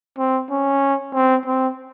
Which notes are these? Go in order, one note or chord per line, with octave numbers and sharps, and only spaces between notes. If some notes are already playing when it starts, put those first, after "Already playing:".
C4
C#4
C4
C4